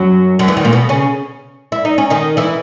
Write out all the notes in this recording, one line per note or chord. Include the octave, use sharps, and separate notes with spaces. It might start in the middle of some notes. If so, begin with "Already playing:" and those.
Already playing: F#2 F#3
F#2 F#3
E2 E3
D#3
A#2 A#3
B2 B3
C#3 C#4
E4
D#4
C#4
D#3 D#4
E3 E4